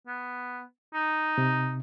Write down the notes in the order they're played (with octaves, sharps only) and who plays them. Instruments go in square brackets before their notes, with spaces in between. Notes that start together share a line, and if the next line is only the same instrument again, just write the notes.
[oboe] B3
D#4
[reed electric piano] C3